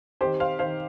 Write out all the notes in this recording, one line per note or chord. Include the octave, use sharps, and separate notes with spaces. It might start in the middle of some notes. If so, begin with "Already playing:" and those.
D#3 C4 D#4 G4 C5
C5 F5
D#3 C4 D#4 C5 F5